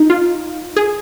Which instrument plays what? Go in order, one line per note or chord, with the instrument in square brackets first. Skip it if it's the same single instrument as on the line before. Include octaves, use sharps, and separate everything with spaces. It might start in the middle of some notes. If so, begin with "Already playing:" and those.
Already playing: [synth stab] D#4
F4
G#4